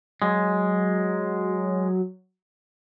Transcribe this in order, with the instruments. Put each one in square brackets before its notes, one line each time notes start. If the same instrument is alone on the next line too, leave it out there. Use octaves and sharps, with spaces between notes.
[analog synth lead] F#3 [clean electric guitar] G#3